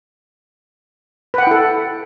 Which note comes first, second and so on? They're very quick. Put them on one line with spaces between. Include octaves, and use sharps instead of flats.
B4 F#5 G5 E4 A4